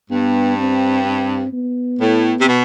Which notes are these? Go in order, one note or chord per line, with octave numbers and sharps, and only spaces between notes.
G2 B3
C4
C4
B3
A2
C3
B2